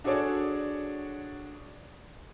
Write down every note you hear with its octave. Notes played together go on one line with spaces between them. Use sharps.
D4 F#4 G#4 A4 C#5 D5